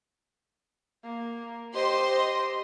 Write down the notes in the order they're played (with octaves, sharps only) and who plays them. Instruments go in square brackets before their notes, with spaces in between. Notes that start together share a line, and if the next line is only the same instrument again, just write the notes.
[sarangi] A#3
[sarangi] G4 [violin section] C5 D#5 C6